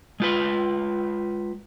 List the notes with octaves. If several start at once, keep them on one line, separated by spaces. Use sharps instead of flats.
G#3 F4 B4